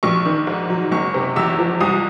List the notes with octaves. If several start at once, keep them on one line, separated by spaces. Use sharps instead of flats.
A#1 C#6
D#3
G#2
F#3
F#1 C#6
C3
E2 E6
F3
C2 D#6